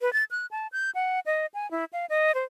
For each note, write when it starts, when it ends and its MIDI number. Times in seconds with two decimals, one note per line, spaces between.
0.01 0.12 71
0.13 0.24 93
0.31 0.46 90
0.51 0.67 81
0.72 0.90 91
0.95 1.20 78
1.26 1.46 75
1.54 1.70 80
1.71 1.85 64
1.93 2.06 77
2.10 2.34 75
2.35 2.44 72